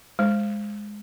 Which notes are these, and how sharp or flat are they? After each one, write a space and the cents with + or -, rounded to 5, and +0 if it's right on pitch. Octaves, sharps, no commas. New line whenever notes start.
G#3 +0 C5 +0